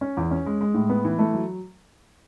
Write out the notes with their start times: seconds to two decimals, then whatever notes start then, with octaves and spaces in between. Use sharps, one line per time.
0.01 C#4
0.17 E2
0.31 C#4
0.46 G#3
0.61 G#3
0.74 A2
0.89 B3
1.05 E3
1.19 A3
1.34 F#3